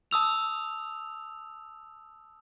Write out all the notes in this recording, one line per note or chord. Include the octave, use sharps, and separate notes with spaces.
A5 D#6 E6 F7